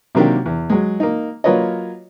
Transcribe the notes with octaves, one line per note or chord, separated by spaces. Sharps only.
C3 D#3 F#3 A#3 D4 G4
E2
F#3 G#3
A#3 D#4
F#3 A#3 F4 B4 C#5 D#5